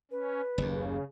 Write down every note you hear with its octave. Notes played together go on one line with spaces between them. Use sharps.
C#4 B4
F#1 D#2 C#3